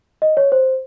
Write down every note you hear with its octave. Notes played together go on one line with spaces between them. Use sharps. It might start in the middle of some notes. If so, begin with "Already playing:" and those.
D#5
C#5
C5